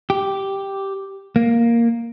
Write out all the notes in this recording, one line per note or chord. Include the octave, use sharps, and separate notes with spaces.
G4
A#3